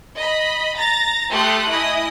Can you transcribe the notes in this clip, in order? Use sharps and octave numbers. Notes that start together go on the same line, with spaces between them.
D#5 B5
A#5 A6 A#6
A3 G4 A4 C6 D#6 F#6
E4 D#5 G#5 D#6